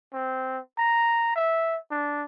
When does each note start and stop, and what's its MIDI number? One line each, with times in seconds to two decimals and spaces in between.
0.13 0.59 60
0.78 1.30 82
1.36 1.78 76
1.91 2.25 62